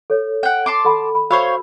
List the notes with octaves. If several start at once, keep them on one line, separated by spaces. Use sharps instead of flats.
A4 C#5
F#5 G5
A5 C6 D6
A4 F#5 B5
B5
F#4 C5 C#5 F5 B5 E6